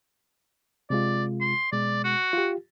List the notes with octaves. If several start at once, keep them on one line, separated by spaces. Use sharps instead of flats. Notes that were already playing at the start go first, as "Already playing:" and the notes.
C3 G#3 F4 D5
C6
B2 G#3 D5
F#4
F4 G4